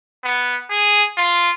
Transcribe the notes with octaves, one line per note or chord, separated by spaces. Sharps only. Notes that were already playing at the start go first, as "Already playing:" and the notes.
B3
G#4
F4